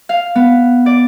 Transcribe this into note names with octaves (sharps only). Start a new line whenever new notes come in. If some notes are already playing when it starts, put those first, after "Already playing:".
F5
B3
D5